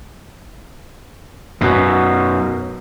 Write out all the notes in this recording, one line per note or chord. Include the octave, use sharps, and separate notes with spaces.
F#2 B2